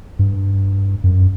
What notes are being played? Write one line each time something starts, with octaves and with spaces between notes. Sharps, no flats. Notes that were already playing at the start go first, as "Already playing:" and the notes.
G2
F#2